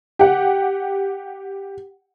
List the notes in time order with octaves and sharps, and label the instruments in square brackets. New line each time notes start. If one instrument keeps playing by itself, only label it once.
[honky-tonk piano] G4 F#5